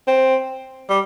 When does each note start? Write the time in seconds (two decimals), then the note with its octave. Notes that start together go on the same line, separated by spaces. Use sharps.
0.08 C4
0.90 G3